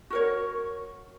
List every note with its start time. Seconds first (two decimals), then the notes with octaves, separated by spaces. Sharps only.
0.10 F#4 A#4 C#5